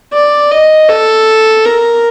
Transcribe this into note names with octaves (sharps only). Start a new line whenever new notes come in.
D5
D#5
A4
A#4